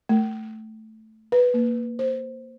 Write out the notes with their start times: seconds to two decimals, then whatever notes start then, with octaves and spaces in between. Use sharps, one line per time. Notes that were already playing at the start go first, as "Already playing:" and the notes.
0.09 A3
1.32 B4
1.54 A#3
1.99 C5